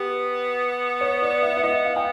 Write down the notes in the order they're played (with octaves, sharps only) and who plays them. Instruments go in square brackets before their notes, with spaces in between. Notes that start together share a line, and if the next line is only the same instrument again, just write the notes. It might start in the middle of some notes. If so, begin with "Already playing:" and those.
Already playing: [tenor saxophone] B3 [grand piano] G4
[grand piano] C#5
D5
E5
E5
[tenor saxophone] B3 [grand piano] D#5
[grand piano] F5
[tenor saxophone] B3 [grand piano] G5